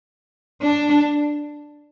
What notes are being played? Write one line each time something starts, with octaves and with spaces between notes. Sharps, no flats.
D4